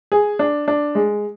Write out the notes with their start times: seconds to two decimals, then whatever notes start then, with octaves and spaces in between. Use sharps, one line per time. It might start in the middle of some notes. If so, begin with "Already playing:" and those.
0.12 G#4
0.39 D4
0.68 D4
0.95 G#3